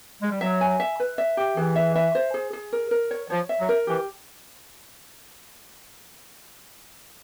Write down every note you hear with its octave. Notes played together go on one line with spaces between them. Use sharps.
G#3
G3
F#3 E5
G#5
E5
B4
E5
G4
E3 G#4
E5
E5
C5
G#4
G#4
A#4
A#4
C#5
F3 C#5
E5
F#3
A#4
E3 G4